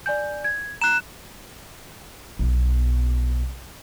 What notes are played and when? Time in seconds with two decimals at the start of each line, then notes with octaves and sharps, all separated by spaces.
0.06 D5 G#5 G6
0.44 G#6
0.81 A#5 F#6 E7
2.39 B1 B3